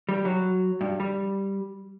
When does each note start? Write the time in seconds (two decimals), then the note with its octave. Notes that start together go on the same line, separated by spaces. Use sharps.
0.09 G3
0.25 F#3
0.81 G2
1.00 G3